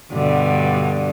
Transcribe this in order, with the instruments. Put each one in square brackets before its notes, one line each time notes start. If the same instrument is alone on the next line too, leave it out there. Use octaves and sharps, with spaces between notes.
[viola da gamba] G2 B2 D3